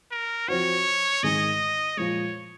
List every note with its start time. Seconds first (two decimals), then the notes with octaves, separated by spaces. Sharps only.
0.11 A#4
0.48 F3 C4 F#4 C#5
1.23 G#2 D#3 G#3 D#4 D#5
1.97 A#2 F3 G#3 C#5